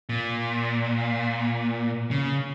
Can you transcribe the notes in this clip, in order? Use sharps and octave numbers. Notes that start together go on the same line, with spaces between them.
A#2
C#3